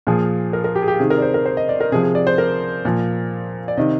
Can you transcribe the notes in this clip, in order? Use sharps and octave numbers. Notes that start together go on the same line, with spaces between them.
A#2 F3 G#4
A#4
A#4
G4
G#4
G4
C3 D#3 G#4
A#4
D5
C5
A#4
C5
D#5
D5
A#4
C3 F3 G#4
G#4
D5
C5
A#4
A#2 F3
D5
C3 D#3 D#5